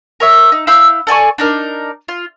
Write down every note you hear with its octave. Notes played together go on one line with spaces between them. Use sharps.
A#4 C#5 E5
D#4
E4 F5 E6 G6
A4 D5 G#5 C#6
D4 D#4 A#4
F4